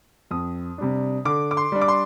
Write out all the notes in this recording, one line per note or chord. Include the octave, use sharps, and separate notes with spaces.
F2 D#6
C3 G3 D4
D3 D6
D6
C6
G3 D4
D6
C6